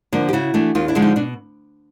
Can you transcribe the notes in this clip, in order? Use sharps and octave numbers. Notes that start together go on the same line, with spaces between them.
D3 F3 A#3 D4
G4
C#3 E4 F#4
E3 A3 D4
D#2 D#4 F4
D4 E4
D3 F3 G#3
D#4
B2 D4